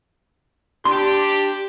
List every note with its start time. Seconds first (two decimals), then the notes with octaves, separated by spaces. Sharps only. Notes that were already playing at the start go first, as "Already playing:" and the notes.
0.85 D4 G4 C6